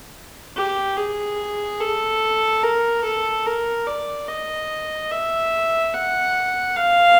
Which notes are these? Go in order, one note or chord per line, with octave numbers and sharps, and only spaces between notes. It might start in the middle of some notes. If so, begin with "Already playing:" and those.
G4
G#4
A4
A#4
A4
A#4
D5
D#5
E5
F#5
F5